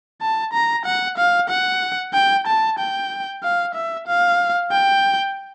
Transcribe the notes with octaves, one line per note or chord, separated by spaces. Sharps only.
A5
A#5
F#5
F5
F#5
G5
A5
G5
F5
E5
F5
G5